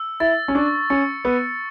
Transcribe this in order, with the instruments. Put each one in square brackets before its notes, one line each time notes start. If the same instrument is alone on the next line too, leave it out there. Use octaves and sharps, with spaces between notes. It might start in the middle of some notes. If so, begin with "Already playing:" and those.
Already playing: [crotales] E6
[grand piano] E4 [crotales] A6
[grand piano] C#4
[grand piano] D4 [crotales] C#6
[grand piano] C#4 [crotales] C#7
[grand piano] B3 [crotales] E6